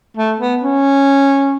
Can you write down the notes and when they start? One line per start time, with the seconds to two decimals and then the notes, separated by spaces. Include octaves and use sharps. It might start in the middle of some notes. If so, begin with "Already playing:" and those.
0.17 A3
0.40 B3
0.63 C#4